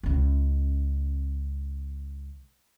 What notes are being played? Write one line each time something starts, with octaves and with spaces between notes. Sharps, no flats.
C#2 C#4